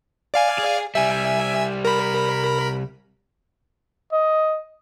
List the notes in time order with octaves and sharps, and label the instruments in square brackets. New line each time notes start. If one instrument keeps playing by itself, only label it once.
[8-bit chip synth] D5 F5 G#5
[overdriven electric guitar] G#4
[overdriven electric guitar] C2 G3 [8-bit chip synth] E5 G#5
[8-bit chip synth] A#4 B5
[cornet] D#5